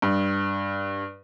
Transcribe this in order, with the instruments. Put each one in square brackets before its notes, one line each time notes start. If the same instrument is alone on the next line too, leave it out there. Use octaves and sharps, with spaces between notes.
[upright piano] G2